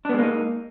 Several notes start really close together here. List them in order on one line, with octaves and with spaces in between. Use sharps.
D4 B3 G#3 A#3 D#4